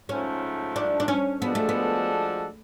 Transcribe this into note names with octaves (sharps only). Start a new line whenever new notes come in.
G#2 F3 A3 C#4
D4
D4
C#4
F3 G#3 B3 D4 F#4 A4
A3
B3